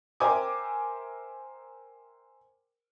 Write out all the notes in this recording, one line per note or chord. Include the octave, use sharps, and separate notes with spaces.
A#4 C5 E5 G5 G#5 D6